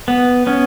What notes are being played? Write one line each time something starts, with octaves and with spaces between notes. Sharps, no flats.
B3
B3 C#4